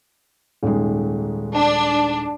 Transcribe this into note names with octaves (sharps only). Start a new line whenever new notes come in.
D#1 G#2 G#3
D4